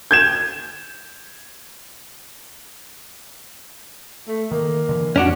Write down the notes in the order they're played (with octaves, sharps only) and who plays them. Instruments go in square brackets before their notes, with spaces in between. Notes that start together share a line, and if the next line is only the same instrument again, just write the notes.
[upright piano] G6 G#6 E7
[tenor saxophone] A3
[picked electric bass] D#3 [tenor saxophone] A#3
[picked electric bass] D3 E3
[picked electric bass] F2 [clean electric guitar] C#4 D4 F#4